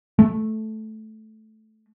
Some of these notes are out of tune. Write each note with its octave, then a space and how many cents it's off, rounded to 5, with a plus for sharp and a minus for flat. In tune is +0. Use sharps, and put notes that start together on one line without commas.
A3 -10